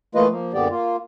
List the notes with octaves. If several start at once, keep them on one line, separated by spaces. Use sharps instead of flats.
E3 A3 A#3 F4 B4 D#5
F3 A#3
F#2 A#2 D3 B3 G4 D5
A#3 F4